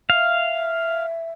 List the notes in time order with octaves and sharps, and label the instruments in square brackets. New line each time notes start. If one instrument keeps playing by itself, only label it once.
[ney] E5 [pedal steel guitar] F5